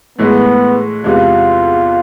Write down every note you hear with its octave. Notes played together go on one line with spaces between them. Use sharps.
A2 E3 G#3 B3
E2 C3 E3 G#3 F4